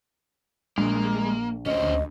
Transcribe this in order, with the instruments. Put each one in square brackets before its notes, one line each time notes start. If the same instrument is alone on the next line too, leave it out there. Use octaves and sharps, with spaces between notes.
[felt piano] A#1 [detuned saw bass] G#3 [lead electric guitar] A#3
[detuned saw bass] D2 [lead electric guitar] C#4 C5 [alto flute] D#5